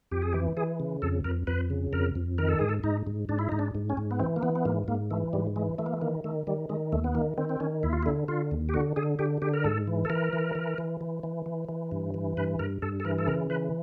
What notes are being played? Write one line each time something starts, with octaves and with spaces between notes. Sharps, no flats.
F2 G4
G#4
E3 G4
E3 G#4
C#3
F2 A4
F2 A#4
F2 B4
C#3
F2 A#4
F2
D#3 A#4
A4
G#2 G#4
A4
G#2 D#4
G#2
G#2 D4
E4
G#2 D#4
D4
G#2
C#4
G#2
B3
E3 C4
A#3
E3 B3
B3
G#2 A#3
G#2 A#3
E3 A3
G#2 G3
E3 G#3
E3 A3
A#3
A3
D#3 A#3
D#3 A3
D#3 G3
D#3 G#3
D#2 A3
B3
D#3 A#3
D#3 C4
C4
D#3 C#4
D#2 E4
F4
E4
D3
D3 F4
D#2
G4
D3 F#4
D3 G#4
D3 G4
D3 G4
A#4
G#2 A4
E3
A4
E3 A#4
E3
E3
E3
E3
E3
E3
E3
G2
E3
G2 B4
G2 A#4
G2 A4
A4
E3 A#4
A4
C#3 A#4
E3 B4